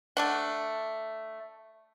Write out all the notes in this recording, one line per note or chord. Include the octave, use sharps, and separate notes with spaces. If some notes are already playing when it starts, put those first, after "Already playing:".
A3 D4 F#5